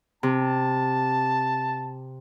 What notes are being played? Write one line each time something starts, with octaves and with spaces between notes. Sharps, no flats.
C3 A5